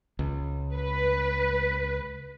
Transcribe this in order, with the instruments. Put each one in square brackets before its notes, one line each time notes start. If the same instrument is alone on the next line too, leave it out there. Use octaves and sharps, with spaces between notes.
[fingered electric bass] C#2
[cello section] B4